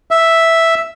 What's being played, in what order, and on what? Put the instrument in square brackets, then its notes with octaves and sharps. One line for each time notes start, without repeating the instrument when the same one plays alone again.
[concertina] E5